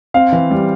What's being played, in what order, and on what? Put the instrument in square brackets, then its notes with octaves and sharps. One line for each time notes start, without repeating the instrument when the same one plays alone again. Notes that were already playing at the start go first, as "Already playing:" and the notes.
[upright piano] C4 [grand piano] F5
[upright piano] E3
G3